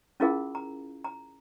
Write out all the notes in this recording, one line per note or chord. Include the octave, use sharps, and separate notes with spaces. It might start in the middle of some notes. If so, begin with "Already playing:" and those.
C#4 E4 F4 G#4 A#4 F5
A#5
A#5